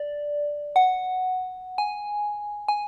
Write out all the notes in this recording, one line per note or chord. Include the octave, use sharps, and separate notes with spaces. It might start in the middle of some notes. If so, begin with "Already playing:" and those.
Already playing: D5
F#5
G#5
G#5